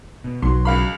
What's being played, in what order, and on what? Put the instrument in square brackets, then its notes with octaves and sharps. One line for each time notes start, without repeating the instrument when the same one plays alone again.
[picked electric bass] B2
[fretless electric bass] B1 [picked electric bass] F#3 [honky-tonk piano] C6
[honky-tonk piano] C#2 F5 B5